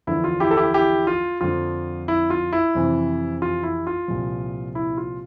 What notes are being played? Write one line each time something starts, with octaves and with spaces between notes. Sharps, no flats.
E2 D3 F3 E4
F4
E4 G4
A4
E4 G4
E4 G4
F4
F2 D3 F3 F4
E4
F4
E4
F2 C3 E3
F4
E4
F4
C2 A#2 F3
E4
F4